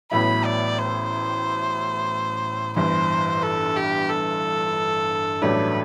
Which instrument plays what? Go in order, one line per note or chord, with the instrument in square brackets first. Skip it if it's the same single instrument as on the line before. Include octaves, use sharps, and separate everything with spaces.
[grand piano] A1 A2 F#3 B3 E4 [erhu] B5
[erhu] D5
C5
[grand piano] G1 G2 E3 [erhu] C5
[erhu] A4
G4
A4
[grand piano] A1 G2 F#3 A3 D4 [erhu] B4